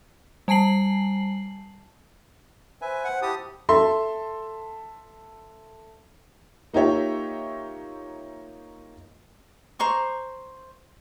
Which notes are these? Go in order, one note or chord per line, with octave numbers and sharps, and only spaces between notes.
G3 G#5 A5 C7 F#7
B4 C5 E5 G#5
F#5
E4 G4 A5 D#6
A4 E5 C6
A#3 D#4 F4 G4 C#5 E5
C5 A#5 C#6 D6